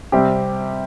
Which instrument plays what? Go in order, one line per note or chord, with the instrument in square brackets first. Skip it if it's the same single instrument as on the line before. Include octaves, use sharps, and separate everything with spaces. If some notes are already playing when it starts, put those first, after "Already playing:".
[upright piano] C3 G3 C4 G4